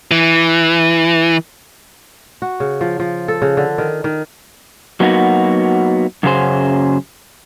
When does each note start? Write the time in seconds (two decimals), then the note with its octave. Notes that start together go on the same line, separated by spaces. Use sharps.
0.11 E3
2.42 F#4
2.60 C#3
2.81 F3
3.00 F3
3.28 A4
3.42 C#3
3.57 D3
3.78 D#3
4.04 D#3
5.00 F#3 A#3 B3 D#4 F#4
6.23 F#2 C#3 F#3 G#4 C5